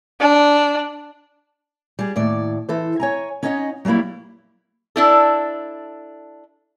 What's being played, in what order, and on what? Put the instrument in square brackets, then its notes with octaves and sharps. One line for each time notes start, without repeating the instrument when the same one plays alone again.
[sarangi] D4
[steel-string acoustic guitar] G3 G#4
D#2 A2 D5
E3 A4 C5
C#5 G#5 A#5
C#4 D#4 C#5 D#5 F5 F#5
F#3 G3 A3 A#3 E4
[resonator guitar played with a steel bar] D4 E4 A4